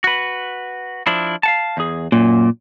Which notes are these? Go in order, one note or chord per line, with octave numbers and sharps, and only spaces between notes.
F#4 B4
F3 D4 E4
F5 F#5 A5
E2 G#4
F#2 A#2